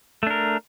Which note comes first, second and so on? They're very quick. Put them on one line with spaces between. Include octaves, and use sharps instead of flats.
A3 D4 A#4